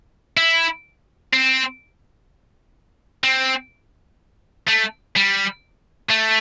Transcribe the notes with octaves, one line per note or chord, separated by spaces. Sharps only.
E4
C4
C4
A3
G3
A3